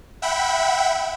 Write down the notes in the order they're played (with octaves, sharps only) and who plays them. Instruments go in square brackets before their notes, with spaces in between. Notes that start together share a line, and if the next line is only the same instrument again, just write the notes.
[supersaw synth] E5 F#5 G5 B5